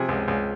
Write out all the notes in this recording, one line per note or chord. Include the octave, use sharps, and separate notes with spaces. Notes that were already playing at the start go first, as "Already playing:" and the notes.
Already playing: C3 F3 G#4
C#2
C#2